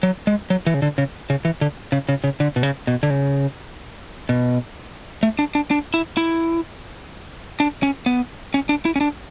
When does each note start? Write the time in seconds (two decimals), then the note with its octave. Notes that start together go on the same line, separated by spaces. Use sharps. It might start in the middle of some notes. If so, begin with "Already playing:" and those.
0.03 F#3
0.27 G#3
0.50 F#3
0.67 E3
0.74 C#3
0.82 D3
0.98 C#3
1.30 C#3
1.45 E3
1.61 D3
1.92 C#3
2.09 C#3
2.24 C#3
2.40 D3
2.56 B2
2.63 C#3
2.87 B2
3.03 D3
3.10 C#3
4.29 B2
5.23 A3
5.39 D4
5.55 D4
5.71 D4
5.94 E4
6.17 E4
7.60 D4
7.83 C#4
8.06 B3
8.54 C#4
8.69 D4
8.85 E4
8.96 C#4
9.01 D4